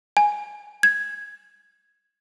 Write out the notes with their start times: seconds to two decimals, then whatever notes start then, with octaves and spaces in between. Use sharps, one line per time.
0.17 G#5
0.83 G#6